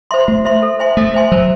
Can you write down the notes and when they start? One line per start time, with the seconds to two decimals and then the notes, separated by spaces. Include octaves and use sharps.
0.11 C5 E5 C6
0.28 A3 F#4
0.45 C5 E5 C6
0.62 A4
0.79 C5 E5 G#5 C6
0.97 A3 A4
1.14 C5 E5 G#5 C6
1.31 F#3 C5